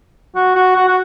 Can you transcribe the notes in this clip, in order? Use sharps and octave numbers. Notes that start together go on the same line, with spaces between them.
F#4
F#4
F#4
F#4